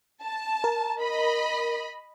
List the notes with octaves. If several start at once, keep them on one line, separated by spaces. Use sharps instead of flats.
A5
A#4
D#5 B5